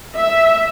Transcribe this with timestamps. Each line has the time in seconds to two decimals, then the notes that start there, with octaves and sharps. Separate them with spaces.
0.17 E5